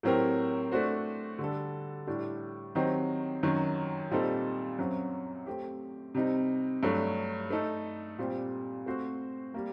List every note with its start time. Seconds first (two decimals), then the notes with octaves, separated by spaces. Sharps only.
0.03 A2 F#3 C4 G4 A#4
0.72 A3 D4 F#4 C5
1.39 D3 G3 D4 A4
2.07 A2 G3 D4
2.75 D#3 F#3 C4 D#4 G4
3.43 F#2 D#3 F#3
4.11 A#2 G3 C4 D#4 A4
4.79 F#2 F#3 C4
5.46 A3 C4 G4
6.15 C3 G3 C4 D#4
6.83 G2 F#3 A3
7.50 A3 D#4 A4
8.18 A#2 G3 C4 G4
8.86 A3 C4 F#4 C5
9.54 G3 A#3